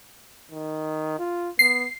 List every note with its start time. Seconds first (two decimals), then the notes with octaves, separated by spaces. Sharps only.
0.51 D#3
1.19 F4
1.59 B3 C7